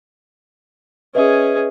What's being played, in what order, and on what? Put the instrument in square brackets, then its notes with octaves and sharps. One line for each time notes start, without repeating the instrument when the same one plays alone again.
[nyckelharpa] C#4 G#4 [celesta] B4 D#5 E5